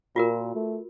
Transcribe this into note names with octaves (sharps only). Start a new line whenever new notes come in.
A#2 F4 F#4 A#4
A3